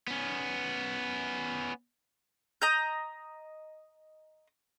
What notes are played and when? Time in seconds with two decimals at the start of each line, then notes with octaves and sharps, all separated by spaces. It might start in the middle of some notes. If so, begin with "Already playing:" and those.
0.08 B3 C#4
2.62 D#5 A#5 G6